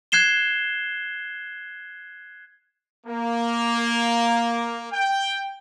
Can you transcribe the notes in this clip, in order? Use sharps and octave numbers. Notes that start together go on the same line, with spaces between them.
F#6 G#6 C7 E7 G7
A#3
G5